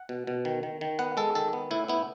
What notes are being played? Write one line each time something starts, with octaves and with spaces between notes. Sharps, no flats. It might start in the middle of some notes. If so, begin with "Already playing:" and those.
Already playing: F#5
B2
B2
D#3
D#3
D#3
B3 F#5
G#3 A4
D#3 A4
B3
A2 E4
B3 E4